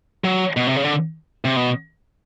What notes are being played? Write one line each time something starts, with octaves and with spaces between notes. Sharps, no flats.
F#3
B2
C3
C#3
D3
C3
B2